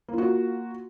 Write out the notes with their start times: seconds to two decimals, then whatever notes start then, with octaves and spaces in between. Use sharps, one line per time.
0.08 A#3
0.13 F4
0.18 F#4